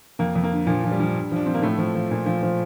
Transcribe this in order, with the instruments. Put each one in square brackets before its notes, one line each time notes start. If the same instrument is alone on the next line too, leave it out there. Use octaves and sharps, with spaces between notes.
[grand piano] F2 A#3
F2
A#3
D3
A#2 F3
F3
G3
F3
G2
F3 D4
F3 C4
A#3
A2 A3
F3
F3
A#2
F3
F3